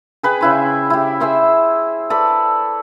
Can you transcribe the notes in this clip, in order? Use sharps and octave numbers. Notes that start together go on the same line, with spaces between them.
G#4 B4 G5 G#5
C#3 E4 C5
E4 G4
G#4 C5 E5 C6
A4 B4 D5 B5